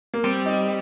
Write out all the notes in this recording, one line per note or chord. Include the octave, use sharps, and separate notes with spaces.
A#3
G3 C4
D#4